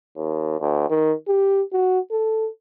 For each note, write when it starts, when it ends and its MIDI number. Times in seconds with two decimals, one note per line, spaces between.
0.17 0.58 39
0.60 0.89 38
0.90 1.13 51
1.28 1.62 67
1.72 1.99 66
2.11 2.49 69